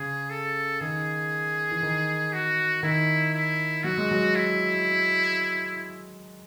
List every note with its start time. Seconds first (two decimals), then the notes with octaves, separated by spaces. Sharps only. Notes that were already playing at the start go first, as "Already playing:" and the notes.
Already playing: C#3 G#4
0.30 A4
0.81 D#3 G#4
1.71 E3
1.83 D#3
2.33 F#4
2.83 D#3 E4
3.34 E4
3.84 F#3 F#4
3.98 G#3
4.11 F#3
4.35 E4